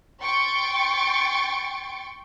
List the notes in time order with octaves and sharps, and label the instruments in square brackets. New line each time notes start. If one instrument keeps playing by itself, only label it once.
[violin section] G5 C6 C#6 A6 C#7 D7